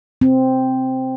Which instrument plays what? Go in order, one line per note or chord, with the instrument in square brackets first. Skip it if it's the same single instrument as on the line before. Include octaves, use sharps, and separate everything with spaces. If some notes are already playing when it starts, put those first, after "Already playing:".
[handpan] C4